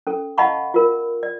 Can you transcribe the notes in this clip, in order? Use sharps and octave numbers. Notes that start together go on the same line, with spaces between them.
C#4 A4
D#5 F5 F#5 A5 B5 C#6
F4 A#4
D5